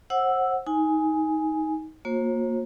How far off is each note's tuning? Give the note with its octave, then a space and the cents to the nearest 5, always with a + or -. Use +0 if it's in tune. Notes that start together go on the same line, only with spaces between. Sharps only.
C5 +30 F#5 +0 E6 +0
D#4 +20 G#5 +0
A#3 +0 F#4 -45 C5 +45